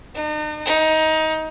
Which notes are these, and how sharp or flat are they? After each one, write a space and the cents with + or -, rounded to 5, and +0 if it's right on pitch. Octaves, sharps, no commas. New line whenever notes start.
D#4 -45
D#4 +20